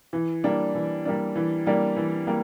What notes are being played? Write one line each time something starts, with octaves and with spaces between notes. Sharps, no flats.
E3
G3 A#3 D4
E3
G3 A#3 D4
E3
G3 A#3 D4
E3
G3 A#3